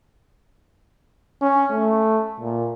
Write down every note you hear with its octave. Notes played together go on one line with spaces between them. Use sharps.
C#4
A3
A#2